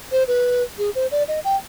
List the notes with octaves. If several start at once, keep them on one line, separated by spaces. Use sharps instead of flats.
C5
B4
G#4
C5
D5
D#5
G5